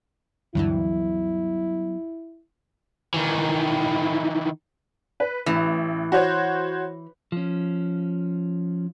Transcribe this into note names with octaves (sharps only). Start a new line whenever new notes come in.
D2 G2 E3 F#3 G3 B3 E4
D#3 E3
B4
A1 E3
F#4 C5 C#5
F3 C#4